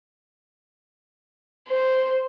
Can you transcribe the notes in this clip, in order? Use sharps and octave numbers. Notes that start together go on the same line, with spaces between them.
C5